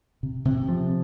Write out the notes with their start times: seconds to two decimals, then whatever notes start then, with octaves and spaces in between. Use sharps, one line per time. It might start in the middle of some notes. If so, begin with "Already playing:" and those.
0.23 C3
0.45 C3
0.69 F3